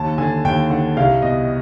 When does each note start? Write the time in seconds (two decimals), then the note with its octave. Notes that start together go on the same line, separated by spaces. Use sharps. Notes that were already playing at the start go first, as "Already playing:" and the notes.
Already playing: D#2 A5
0.18 D3 G#5
0.44 D#2 G5
0.70 D3 F#5
0.97 C2 F5
1.22 B2 D#5